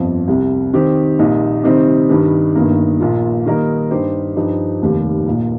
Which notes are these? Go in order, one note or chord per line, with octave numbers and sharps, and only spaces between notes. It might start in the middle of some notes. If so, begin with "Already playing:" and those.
Already playing: G1 F2 F3 C4
C2 C3 G3
D#3 C4 G4
A#1 A#2 G3 D#4
C3 D#3 G3 C4 D#4
G2 D#3 G3
G1 G2 D#3 A#3
A#1 A#2 A#3 F4
D#3 G3 A#3 D#4 A#4
G2 G3 D#4 G4 C5
G2 F3 D#4 G4
F1 D#2 D#3 G3
A#1 A#2 A#3